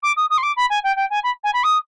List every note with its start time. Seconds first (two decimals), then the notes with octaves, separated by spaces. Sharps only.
0.03 D6
0.17 D#6
0.30 D#6
0.38 C6
0.43 D6
0.56 B5
0.70 G#5
0.84 G5
0.96 G5
1.10 G#5
1.24 B5
1.44 G#5
1.53 B5
1.64 D#6